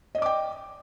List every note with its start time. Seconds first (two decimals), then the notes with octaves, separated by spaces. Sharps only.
0.15 D#5
0.18 D5
0.22 D6
0.26 G5